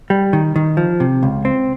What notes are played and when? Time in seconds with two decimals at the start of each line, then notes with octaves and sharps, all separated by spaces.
0.10 G3
0.33 D#3
0.56 D#3
0.77 F3
1.00 C3
1.23 C#2
1.45 C4